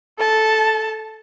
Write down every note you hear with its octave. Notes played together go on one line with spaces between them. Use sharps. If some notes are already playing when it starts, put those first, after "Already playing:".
A4 A5